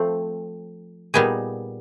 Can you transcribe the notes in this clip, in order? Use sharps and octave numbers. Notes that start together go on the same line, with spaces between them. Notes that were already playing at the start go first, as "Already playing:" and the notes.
Already playing: F3 A3 C4
A#2 G3 B3 D#4 G#4